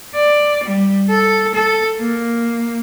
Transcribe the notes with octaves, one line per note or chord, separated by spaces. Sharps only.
D5
G3
A4
A4
A#3